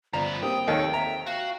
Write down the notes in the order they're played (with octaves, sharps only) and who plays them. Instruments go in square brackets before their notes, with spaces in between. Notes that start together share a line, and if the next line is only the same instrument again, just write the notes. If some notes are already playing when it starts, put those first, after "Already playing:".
[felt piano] G1 [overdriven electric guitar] F3 B3 [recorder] D5 [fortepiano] A#5
[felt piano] A#3 C4 G4 [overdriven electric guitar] G5 [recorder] D#6
[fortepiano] D#2 D#3 A4 [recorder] C#5
[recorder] E5 [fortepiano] A#5
[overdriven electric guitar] F#4 [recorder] F5